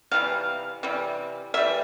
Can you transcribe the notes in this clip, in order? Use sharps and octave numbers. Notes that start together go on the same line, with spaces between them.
C3 E3 G3 F5
C3 E3 G3
E3 G3 A#3 E5